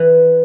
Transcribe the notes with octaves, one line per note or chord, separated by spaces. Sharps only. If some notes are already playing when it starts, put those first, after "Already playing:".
Already playing: E3